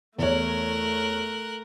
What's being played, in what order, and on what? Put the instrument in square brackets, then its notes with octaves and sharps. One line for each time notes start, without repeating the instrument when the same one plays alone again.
[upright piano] E2 C#5 [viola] A3 [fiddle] A#4 F#6